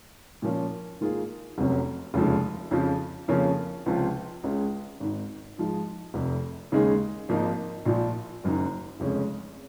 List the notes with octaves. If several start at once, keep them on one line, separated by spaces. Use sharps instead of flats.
A#2 F3 A#3 C#4
G#2 D#3 A#3 F4 G#4
F1 F2 C3 F#3 C#4
F1 D#2 C#3 F3 G#3
F2 C#3 F3
F2 C#3 F3 A#3 C#4
C#2 C3 F3 C4 F4
C#2 C#3 G#3
G#1 G#2 D#3
G#2 F3 G#3
F1 F2 C3
D#2 C#3 G#3 D#4 G#4
G#1 G#2 F3 A#3 D#4
A#1 A#2 F3
F#1 F#2 D#3
F1 F2 C#3 G#3 C#4